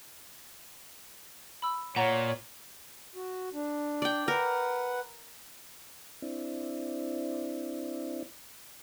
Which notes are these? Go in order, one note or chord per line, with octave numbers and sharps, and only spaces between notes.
B5 E6
A#2 C#5 F#5 A#5
F#4
D4
D5 G5
A#4 B4 F#5
C4 D4 E4